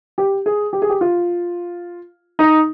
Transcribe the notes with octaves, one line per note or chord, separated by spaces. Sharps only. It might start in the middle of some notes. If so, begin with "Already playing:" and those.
G4
G#4
G4
G#4
G4
F4
D#4